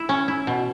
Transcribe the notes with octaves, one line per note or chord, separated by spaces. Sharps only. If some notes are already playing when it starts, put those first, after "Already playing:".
Already playing: E4
C#4
E4
B2